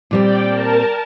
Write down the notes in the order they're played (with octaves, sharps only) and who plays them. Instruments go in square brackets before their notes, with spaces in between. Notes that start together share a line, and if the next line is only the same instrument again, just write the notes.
[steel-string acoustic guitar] A#2 G3 C4 [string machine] D5 G5
[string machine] A#4 A5